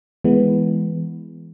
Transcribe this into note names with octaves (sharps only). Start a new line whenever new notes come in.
E3 G#3 B3